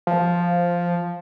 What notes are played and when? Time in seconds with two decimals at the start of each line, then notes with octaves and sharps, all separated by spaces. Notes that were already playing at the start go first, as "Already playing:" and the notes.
0.07 F3